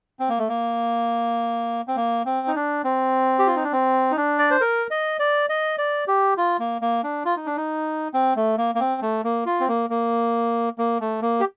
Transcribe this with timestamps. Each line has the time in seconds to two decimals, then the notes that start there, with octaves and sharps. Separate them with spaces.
0.20 C4
0.29 A#3
0.39 A3
0.48 A#3
1.88 C4
1.96 A#3
2.25 C4
2.47 D#4
2.55 D4
2.84 C4
3.39 G4
3.47 F4
3.56 D#4
3.64 D4
3.72 C4
4.11 D#4
4.17 D4
4.39 D5
4.50 C5
4.61 A#4
4.91 D#5
5.19 D5
5.49 D#5
5.78 D5
6.07 G4
6.37 F4
6.59 A#3
6.82 A#3
7.03 D4
7.25 F4
7.36 D#4
7.46 D4
7.57 D#4
8.14 C4
8.36 A3
8.57 A#3
8.75 A#3
8.80 C4
9.02 A3
9.24 A#3
9.46 F4
9.60 C4
9.68 A#3
9.90 A#3
10.78 A#3
11.00 A3
11.22 A#3
11.40 G4